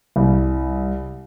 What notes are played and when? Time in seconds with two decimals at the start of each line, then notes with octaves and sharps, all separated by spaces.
0.16 C2